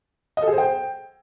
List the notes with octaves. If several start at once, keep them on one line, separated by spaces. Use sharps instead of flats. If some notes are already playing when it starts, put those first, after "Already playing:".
D#5
A4
G#4
C5
G5